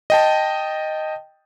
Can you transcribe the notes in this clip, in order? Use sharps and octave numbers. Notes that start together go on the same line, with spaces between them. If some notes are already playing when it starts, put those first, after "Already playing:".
D#5 G5 A5